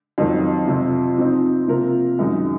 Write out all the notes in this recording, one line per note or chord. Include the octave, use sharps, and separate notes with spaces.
F2 D#3 F#3
F2 C3 F3
F3 C4 D#4
C3 F3 A#3 F4 A#4
F#2 D#3 G#3 D#4